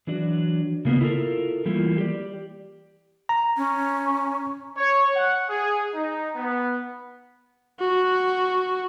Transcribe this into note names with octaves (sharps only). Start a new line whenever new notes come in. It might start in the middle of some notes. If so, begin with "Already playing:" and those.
E3 F#3 D4 F#4 D5
C#3 A#3 B3
E4 F4 A4 A#4
E3 G3 A3 A#3 E4 F4
G4 D5
A#5
C#4
C#5
F#5
G#4
D#4
B3
F#4